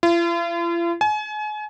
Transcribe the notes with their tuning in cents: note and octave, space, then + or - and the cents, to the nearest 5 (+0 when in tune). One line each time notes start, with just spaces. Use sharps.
F4 -45
G#5 +35